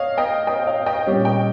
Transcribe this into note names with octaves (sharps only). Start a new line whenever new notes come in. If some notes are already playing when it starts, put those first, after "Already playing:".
Already playing: C#5 D#5 F5
D#5 G5
D#5 G5
C#5 F5
D#5 G5
A#2 G3 C#4
D#5 G5